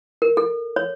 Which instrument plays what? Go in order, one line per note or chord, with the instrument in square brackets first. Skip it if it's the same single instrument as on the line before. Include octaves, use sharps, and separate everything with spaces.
[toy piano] A#4
A4
C#5